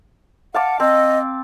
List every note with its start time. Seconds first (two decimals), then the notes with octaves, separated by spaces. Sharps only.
0.54 F5 F#5 A5 D6
0.80 C4 D#5